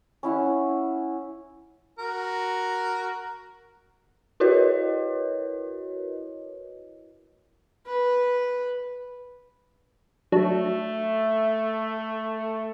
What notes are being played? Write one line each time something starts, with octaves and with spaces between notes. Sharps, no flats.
C#4 E4 F#5
F#4 A#4
E4 F#4 A#4 B4 C#5 D#5
B4
F#3 A3 D4